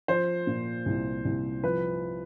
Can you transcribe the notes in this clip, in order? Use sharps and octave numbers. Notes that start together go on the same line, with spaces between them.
F3 C5
A#2
C2
C2
F3 B4